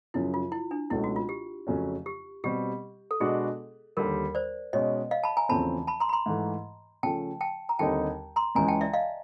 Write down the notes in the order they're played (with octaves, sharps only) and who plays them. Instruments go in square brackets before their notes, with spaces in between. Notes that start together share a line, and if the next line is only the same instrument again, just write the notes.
[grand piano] F#2 C#3 F3 [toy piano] E4
[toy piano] F4
E4
D4
[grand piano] C#2 B2 F#3 A3 [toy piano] E4
[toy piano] F#4
F4
G4
[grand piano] F2 C#3 F#3 A3 C#4
[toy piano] G4
[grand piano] B2 G3 C4 [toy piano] G4
[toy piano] A4
[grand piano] B2 G#3 B3 D4 F#4 [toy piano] G#4
[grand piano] D#2 D3 G3 [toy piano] A#4
[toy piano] C5 D5
[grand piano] B2 G#3 C#4 [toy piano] C#5 D#5
[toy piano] D#5 F5
A5 B5
G#5 A#5
[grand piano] E2 C#3 F3 A3 C4 [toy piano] A5 B5
[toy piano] A5 B5
A#5 C6
B5
A#5 C6
[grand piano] G#2 E3 A3
[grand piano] C#3 F3 A3 [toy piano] G5 A5
[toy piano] G5 A5
A#5
[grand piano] D#2 D3 G3 C4 D#4 [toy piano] G5 A5
[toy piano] A#5 C6
[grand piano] C#2 C#3 E3 G#3 [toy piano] G#5 A#5
[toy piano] G5 A5
D5 E5
D#5 F5